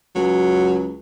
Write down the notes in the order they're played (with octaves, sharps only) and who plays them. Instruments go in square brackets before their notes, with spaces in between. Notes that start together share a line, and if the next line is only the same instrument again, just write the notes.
[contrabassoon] C#2 [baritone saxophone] F#3